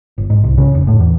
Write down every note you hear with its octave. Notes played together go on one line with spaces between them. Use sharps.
G1
G#2
C2
C#3
F1
A2
E2